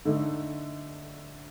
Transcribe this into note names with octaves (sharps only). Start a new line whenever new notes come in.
D3 A3 D#4